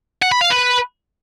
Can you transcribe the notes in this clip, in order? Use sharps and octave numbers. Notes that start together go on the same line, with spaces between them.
F#5
B5
F5
B4